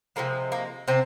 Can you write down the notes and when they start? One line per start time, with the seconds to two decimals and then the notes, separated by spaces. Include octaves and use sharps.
0.16 C3 F3 G#3 A#3
0.52 A#3
0.88 C3 C4